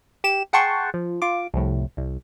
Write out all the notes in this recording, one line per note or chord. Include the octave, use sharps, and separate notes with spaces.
G4 E7
G#4 F#5 G5 A5 C6 C#6
F3
F4 D6
C2 F2 A2
C2